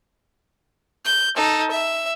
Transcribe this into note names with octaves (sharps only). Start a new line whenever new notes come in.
G6
D#4 A4
E5